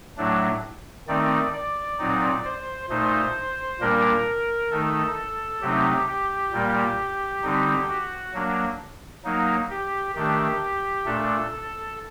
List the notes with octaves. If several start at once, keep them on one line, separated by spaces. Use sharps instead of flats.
A2 F#3 A3 D4
D#3 A3 C4 D#4 D5
D5
A#2 F#3 C4 D#4
C5
A#2 A3 D#4 C5
A#2 G3 A#3 D4 A#4
D#3 A3 D#4 A4
C3 F#3 A3 C4 D#4 G4
G4
A#2 G3 A#3
D3 G3 C4 D#4
F#4
F#3 A#3 D4
F#3 A#3 D#4
G4
D#3 A3 D4 G4
A#2 A3 D4 A4
A4